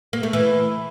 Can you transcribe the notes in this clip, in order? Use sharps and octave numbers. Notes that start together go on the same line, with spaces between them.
A#3
A3
E3